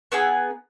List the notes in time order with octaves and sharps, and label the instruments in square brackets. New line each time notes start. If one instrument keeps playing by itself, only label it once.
[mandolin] B3 D#4 G#4 E6